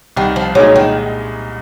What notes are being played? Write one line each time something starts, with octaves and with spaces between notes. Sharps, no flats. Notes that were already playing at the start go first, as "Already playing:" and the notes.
C2 D#3
F3
A#2 F#3 G#3 D#4
D#3